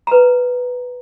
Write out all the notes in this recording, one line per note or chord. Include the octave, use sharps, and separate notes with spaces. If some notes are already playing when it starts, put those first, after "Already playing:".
B4 A#5